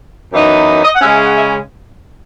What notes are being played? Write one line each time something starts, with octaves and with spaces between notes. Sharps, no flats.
F#2 E3 B3 D#4
D#5
F#5
C#3 G#3 C#4 E5
E5
F#5
E5